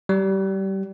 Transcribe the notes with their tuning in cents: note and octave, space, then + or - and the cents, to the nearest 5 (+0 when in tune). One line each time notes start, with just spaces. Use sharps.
G3 -25